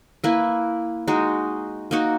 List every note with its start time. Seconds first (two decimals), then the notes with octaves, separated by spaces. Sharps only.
0.24 A#3 E4 B4
1.08 G#3 D#4 F#4
1.91 A#3 D#4 F#4